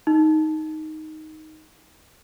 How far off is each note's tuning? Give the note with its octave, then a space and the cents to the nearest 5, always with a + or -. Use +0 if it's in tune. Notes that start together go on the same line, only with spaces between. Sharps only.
D#4 +5